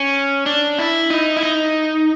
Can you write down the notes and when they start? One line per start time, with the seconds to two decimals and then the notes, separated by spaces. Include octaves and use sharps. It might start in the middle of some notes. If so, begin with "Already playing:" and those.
Already playing: C#4
0.46 D4
0.79 E4
1.10 D#4
1.37 E4
1.43 D#4